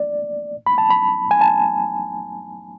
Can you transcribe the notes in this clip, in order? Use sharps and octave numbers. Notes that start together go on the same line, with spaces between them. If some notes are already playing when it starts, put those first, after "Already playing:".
Already playing: D5
B5
A5
B5
G#5
A5